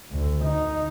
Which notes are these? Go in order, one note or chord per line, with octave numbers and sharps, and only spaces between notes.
D2 D3
D#4